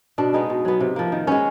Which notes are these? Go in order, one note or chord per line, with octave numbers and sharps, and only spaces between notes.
B2 D4
G#3 B3 D#4
B2
F#3 B3
C3
F3 A#3
D#3
G#3 B3 C#4